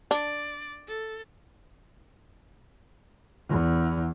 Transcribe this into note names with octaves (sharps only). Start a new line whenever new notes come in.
D4 D5
A4
E2